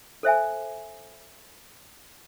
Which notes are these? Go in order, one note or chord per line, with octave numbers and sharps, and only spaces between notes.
A4 C5 E5 G#5